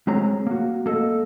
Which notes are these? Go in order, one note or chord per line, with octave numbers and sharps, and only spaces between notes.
G#3 C4 G#4 C#5 A#5
A#3 F#4
A#3 A4 D#5